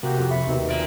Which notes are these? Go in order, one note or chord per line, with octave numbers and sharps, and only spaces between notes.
C3 A#3 F#4 G4
F2
E5 B5 C#6
D#2 B2 D#3 C4
A#4 D5 E5 C6 D7